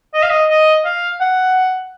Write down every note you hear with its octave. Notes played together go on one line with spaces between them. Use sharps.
D#5
F5
D#5
D#5
F5
F#5